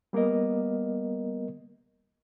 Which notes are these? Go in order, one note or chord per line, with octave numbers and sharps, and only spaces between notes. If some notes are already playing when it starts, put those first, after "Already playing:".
G3 A#3 B3 A#4 D#5